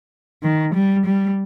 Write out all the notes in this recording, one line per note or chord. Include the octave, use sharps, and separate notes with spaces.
D#3
G3
G3